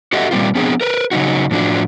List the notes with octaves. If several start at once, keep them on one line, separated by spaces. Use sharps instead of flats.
F#4 G4 A4 D#5 E5 F#5
A#2 G3 A#3 C4 F4
F3 B3 C4 D4 G#4
A#4 B4
C#3 F#3 D#4 F#4
A2 F3 D4 F#4